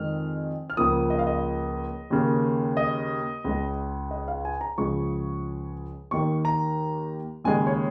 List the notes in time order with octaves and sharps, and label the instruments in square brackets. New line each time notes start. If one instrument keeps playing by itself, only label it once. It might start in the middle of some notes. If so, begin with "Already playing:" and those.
Already playing: [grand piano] F2 D#3 G#3 F6
F6
C#2 C#3 F3 A#3 D#6
D#5
F5
D#5
D#2 C#3 A#3
D#5
C#2 C#3 G#3
D#5
F5
G#5
A#5
C#2 C#3 F3 G#3 C#6
D#2 D#3 A#3 C#6
A#5
D#2 C#3 G#3 G#5
C#5